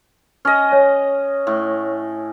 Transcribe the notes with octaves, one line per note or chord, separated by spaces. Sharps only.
C#4 D#5 F6
C#5
A2